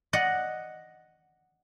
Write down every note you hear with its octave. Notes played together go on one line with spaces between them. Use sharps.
D5 D#5 F#5